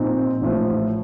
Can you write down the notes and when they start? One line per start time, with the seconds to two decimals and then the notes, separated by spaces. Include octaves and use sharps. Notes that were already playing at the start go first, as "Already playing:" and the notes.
Already playing: A#2 F3 C4 D#4
0.41 A1 A2 F3